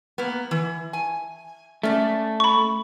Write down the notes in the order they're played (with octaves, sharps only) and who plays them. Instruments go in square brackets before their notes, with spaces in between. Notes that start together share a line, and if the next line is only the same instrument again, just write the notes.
[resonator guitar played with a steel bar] A#3 B3
E3
G#5
[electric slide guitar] A3 [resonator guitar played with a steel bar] C#4 D5
[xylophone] B5 C#6